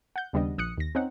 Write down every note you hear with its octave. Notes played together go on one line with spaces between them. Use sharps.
F#5 G6
D#2 C#3 G3 B3 D4 D#5
A#1 D#6 F#6 C#7
D#2 A#6
C4 C#4 D#4 F#5